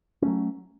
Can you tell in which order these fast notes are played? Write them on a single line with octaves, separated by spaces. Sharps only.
C#4 A3 F#3